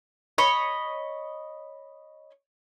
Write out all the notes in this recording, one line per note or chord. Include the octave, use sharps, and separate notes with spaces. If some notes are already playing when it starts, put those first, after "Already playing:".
C#5 D#5 B5 C#6